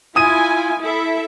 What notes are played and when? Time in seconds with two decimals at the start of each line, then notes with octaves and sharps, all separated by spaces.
0.16 E4 F4 G#5 D#6 D#7
0.81 E4 A4 E5